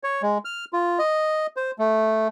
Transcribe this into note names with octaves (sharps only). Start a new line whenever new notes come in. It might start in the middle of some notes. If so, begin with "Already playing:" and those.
C#5
G#3
F6
F4
D#5
C5
A3